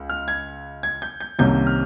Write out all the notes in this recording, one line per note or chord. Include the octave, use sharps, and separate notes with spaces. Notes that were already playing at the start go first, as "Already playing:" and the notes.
Already playing: C#2
F6
G#6
G#6
G6
G6
C2 C3 D#3 A#3 C#4 G6
F6